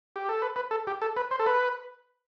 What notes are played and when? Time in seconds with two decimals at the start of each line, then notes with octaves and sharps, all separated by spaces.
0.16 G4
0.29 A4
0.42 B4
0.56 B4
0.71 A4
0.87 G4
1.02 A4
1.17 B4
1.31 C5
1.39 A4
1.46 B4